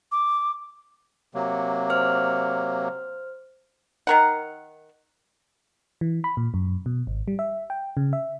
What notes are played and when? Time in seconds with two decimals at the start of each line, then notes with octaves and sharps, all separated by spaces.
0.12 D6
1.34 C3 F#3 A#3
1.90 C5 F6
4.07 D#3 A#4 F#5
6.01 E3
6.24 B5
6.37 A#2
6.54 F#2
6.86 B2
7.07 G#1
7.28 G3
7.39 E5
7.70 G5
7.97 C#3
8.13 E5